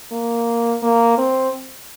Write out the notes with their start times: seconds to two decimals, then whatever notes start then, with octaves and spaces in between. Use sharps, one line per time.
0.12 A#3
0.83 A#3
1.18 C4